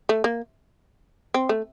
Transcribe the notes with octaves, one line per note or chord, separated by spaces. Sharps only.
A3
A#3
C4
A3